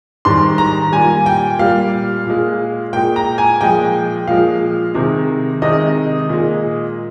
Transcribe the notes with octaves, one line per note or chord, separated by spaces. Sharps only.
G#2 D#3 G3 C6
A#5
A#2 G3 G#5
G5
A#2 G3 F5
A#2 G#3
A#2 G#3 G5
A#5
G#5
A#2 F3 G#3 G5
A#2 F3 G#3 F5
C3 D#3 G#3
C3 D#3 G#3 D#5
A#2 G#3